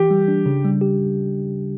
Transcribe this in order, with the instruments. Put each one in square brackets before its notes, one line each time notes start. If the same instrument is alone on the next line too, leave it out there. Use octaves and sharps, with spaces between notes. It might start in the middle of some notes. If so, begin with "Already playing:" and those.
Already playing: [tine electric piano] E3 [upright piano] G4
[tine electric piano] G3
D4
C#3
G3
G4